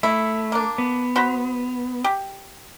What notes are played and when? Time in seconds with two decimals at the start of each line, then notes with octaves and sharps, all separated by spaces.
0.03 A3 E4
0.52 A#3 D4
0.78 B3
1.16 F#4 C5 B5
2.04 G4